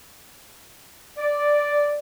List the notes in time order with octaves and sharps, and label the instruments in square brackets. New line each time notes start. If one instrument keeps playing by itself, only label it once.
[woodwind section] D5